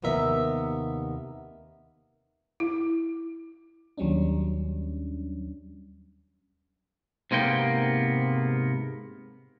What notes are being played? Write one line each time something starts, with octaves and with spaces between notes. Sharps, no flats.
D#2 C3 B3 A#4 E5
E4
D#2 F#3 G3 C#4 D4
G#2 C3 A#3 B3 G5